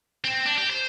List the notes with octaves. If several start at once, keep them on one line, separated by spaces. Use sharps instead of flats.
C4
D4
G4
C5